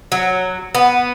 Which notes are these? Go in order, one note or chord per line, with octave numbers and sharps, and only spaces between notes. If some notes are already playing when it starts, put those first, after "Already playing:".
F#3
B3